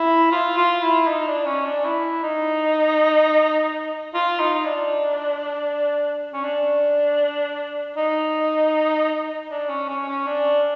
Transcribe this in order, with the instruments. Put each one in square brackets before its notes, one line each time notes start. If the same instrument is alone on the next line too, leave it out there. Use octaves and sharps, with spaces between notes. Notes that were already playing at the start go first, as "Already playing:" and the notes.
Already playing: [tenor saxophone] E4
F4
F4
E4
D#4
D4
C#4
D4
E4
D#4
F4
D#4
D4
C#4
D4
D#4
D4
C#4
C#4
C#4
D4